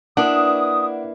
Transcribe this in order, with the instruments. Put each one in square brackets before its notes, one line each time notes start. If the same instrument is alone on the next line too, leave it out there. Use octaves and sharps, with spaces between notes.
[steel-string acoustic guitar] A#3 E4 B4 [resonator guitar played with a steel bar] D4 [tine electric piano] F#5 [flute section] D#6